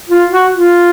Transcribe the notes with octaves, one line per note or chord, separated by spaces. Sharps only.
F4
F#4
F4